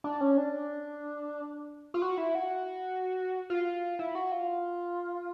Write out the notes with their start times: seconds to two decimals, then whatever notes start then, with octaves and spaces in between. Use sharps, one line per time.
0.04 D4
0.21 C#4
0.37 D4
1.94 F4
2.02 F#4
2.18 E4
2.35 F#4
3.50 F4
3.99 E4
4.15 F#4
4.32 F4